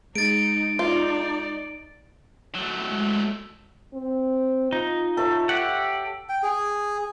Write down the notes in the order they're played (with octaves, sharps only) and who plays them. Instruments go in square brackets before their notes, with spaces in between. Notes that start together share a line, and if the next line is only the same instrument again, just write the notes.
[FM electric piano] G#3 [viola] D#4 [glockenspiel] A6 D7
[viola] D#4 D5 [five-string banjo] F4
[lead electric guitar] F#3 A3
[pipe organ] G#3
[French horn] C4
[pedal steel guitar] D#4 [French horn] F4
[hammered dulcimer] A4 C#5 E5
[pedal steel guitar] G4 F#5
[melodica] G5
G#4